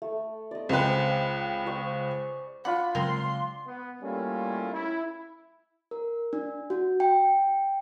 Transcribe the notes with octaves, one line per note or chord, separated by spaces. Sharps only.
A3
D5 D#5
C#2 C4 G#4 B4 C6
C5 D5 C#6
D4 F4 F#5 B5
C#3 F#3 G#3 C4 C#4 A#4 C6
B3
G3 A3 A#3 C#4 E4 F4
E4
A#4
D4
F#4
G5